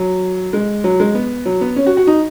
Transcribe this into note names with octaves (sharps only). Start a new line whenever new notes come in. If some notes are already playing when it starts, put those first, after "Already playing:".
Already playing: F#3
G#3
F#3
G#3
B3
F#3
B3
C#4
F#4
F#4
D#4